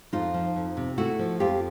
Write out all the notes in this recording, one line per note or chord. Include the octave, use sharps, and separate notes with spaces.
F2 D#4 F4
F3
F2
C3
A3 E4 F#4
F3
F2 F4 G4